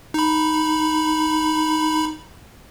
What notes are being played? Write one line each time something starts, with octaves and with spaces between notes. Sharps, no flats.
D#4 B5